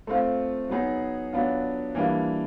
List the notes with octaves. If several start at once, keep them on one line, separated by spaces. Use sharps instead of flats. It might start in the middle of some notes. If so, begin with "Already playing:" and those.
A3 C4 F4
F#3 B3 D#4 G#4
F#3 B3 D4 F4
E3 G3 A#3 D4 F4